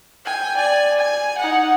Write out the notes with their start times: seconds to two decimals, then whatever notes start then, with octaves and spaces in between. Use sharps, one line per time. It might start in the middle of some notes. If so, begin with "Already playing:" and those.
0.25 G5 G#5
0.57 D5 G#5
0.99 G#5
1.39 D#4 F#5